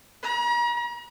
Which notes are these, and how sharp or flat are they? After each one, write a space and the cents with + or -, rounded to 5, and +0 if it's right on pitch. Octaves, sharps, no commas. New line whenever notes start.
A#5 +40